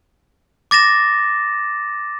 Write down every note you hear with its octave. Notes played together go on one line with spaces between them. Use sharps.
D6 A6 A#6 E7